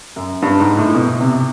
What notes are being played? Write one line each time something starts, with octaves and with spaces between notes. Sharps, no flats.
F#2
G2
G#2
A2
B2
C3